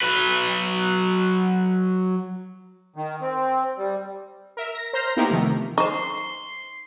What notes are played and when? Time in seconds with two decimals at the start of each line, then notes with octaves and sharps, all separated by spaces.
0.02 F#3 B4
2.96 D#3
3.21 C4
3.77 G3
4.57 A#4 E5
4.75 A#6
4.93 C5 A#5 C6 F6 G6 A#6
5.17 A#3 B3 D#4 E4 G4 A#4
5.30 C3 D#3 F3 A3
5.78 D#4 C5 C6 C#6